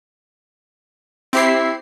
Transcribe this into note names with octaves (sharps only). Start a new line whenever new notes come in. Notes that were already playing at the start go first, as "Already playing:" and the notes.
C4 E4 G4 C7